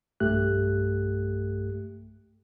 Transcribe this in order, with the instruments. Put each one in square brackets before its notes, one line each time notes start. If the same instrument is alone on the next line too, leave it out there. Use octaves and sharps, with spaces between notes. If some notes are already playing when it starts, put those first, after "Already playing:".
[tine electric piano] B1 G2 A3 G4 F#6